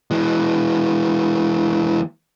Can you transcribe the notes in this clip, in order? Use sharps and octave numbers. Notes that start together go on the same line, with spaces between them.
E3 G#3